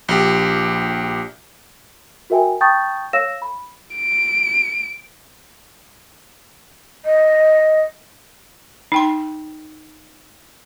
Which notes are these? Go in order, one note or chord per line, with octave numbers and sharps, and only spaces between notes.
A#1 G4
F#4 A#4 E5 G5 G#5
G5 A5 C#6 D#6 G6 A6
C#5 F5 E6 A#6 E7
B5
D7
D#5
D#4 G5 C6